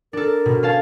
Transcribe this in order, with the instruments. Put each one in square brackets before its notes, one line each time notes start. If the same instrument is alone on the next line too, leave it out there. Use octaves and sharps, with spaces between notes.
[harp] D4 A4 [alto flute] A#4
[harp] B2
C#4 F5 A5